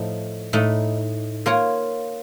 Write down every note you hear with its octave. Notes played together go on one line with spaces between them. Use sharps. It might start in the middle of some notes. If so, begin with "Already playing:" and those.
Already playing: A2 F3 A3 D#4
A2 A3 D#4
A#3 F4 A#4 C#5